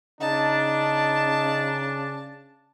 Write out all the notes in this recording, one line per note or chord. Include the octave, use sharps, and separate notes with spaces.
C#3 D4 D#4 A5